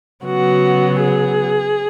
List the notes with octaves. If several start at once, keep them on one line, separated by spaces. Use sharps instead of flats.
C#3 F#3 B3 F#4
G#4